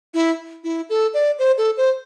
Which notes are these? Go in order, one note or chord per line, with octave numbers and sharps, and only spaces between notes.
E4
E4
A4
D5
C5
A4
C5